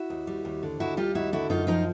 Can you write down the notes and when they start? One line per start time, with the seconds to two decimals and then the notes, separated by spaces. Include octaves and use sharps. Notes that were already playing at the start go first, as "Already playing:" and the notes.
Already playing: E4 F#4
0.10 D#2
0.27 G3
0.45 D#2
0.63 D3
0.80 D#2 E4 F#4
0.97 G3 F4 G4
1.15 D#2 E4 F#4
1.33 D3 E4 F#4
1.50 F#2 D#4 F4
1.67 F3 D#4 F4